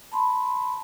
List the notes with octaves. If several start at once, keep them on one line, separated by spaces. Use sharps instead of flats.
A5 B5 C6